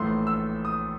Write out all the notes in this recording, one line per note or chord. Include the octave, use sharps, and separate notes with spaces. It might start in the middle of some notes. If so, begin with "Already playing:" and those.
Already playing: A#1 A2 E3 A3 C6
E6
D#6